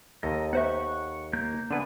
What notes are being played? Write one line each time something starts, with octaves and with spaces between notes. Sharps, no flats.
D#2 A4 A#4 D#5
B3 C5 E5 F#5 C#6
A#3 G6
D3 B3 D4 G#5